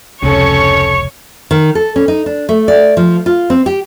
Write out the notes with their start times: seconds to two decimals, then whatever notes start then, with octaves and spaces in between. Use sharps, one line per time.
0.22 F1 C#2 C3 C#4 A4 C#5 C#6
1.51 D#3
1.75 A4
1.96 C#4
2.08 D#4
2.26 D4
2.49 A3
2.68 D5
2.97 F3
3.26 F4
3.50 C4
3.66 G4